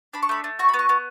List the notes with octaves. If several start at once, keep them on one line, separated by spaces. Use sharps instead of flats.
D4 B5
C#6
A3 B5
A3
F#4 C#6
B5
B3
C#6
B3